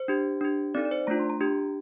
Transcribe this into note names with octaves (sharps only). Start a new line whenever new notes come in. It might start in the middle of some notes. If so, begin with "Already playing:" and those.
Already playing: C5
D4 G4
D4 G4
C4 D#4 A4 D5
D5
C5
A3 D4 F4 A#5
C6
A#5
D4 G4